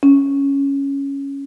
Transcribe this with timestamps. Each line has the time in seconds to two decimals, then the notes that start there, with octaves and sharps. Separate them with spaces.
0.03 C#4